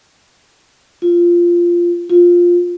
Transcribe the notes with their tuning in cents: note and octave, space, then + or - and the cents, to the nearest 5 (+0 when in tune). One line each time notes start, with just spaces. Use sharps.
F4 -10
F4 +5